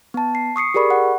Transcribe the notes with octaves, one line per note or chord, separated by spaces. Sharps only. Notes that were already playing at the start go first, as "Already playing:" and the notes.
B3 A5
C7
C#6 D#6 C7 C#7
G4 G#4 A#4 D5 B5 C#6
F#5